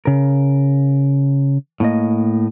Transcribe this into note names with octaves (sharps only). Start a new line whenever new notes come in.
C#3 A#4
A2 A#3 D#5